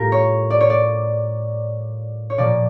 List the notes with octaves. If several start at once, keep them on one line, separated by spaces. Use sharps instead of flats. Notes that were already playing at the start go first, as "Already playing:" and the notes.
Already playing: A2 G3 F4 G4 A#4
C#5
D5
C#5
D5
C#5
A#2 F3 A#3 D5